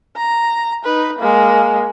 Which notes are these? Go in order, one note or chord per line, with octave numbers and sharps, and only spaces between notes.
A#5
D#4 B4
G#3 A#3